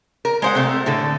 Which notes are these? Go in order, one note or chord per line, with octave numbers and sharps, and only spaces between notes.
A#4
G#3 C5 F#5
C3 A3
A2 D3 A4